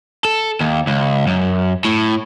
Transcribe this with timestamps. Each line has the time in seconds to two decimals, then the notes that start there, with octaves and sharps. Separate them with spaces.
0.25 A4
0.61 D#2
0.87 C#2
1.27 F#2
1.85 A2